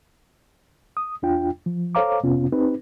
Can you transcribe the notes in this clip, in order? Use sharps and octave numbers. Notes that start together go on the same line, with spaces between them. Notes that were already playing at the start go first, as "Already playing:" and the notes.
D#6
E2 D4 F4 G5
F3
A4 C5 C#5 F5 A#5 D6
F2 C3 B3 C#4 F4
C4 D#4 G4 B4